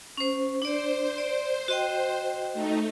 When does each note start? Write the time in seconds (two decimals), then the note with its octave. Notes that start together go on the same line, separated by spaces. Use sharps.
0.17 C#4 C5
0.62 D4 C5 D5
1.18 D5
1.68 F#4 D#5 G5
2.54 A3 D#4